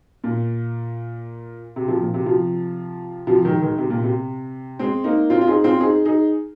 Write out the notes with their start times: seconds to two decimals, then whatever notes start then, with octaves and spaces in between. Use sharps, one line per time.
0.24 A#2
1.76 C3
1.88 C3 F3
2.01 A#2
2.14 C3
2.26 C3 F3
3.27 C3 F3
3.45 D#3 G#3
3.62 D#3 G#3
3.78 C3
3.90 A#2
4.04 C3
4.79 G#3 C4
5.04 A#3 D#4
5.30 C4 F4
5.41 F4
5.47 D#4 G#4
5.64 C4 F4
5.81 D#4 G#4
6.05 D#4 G#4